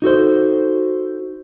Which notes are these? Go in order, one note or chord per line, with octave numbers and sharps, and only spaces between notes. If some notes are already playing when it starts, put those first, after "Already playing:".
D#4 F#4 A4 C5